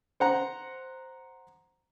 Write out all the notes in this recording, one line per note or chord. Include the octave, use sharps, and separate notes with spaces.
C5 F#5 A#5